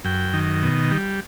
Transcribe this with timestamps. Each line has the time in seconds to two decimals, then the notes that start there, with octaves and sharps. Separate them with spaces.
0.05 F#2 G5
0.33 D#3
0.63 B2
0.91 G3